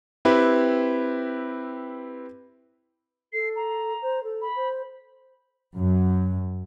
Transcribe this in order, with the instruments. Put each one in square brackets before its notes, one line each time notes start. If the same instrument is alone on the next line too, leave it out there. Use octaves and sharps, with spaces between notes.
[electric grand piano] C4 E4 G4 B4
[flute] A4 [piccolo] C7
[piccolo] A#5
[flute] C5
A4
[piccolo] B5
[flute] C5
[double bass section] F#2